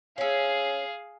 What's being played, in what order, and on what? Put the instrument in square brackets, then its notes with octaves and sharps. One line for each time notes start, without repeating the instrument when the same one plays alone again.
[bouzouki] C#4 E5 [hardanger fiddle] G#4 F5